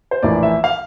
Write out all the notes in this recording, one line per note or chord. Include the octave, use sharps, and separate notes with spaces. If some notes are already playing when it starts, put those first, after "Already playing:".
C5
A#1 A2 E3 A#3 D5
E5
F5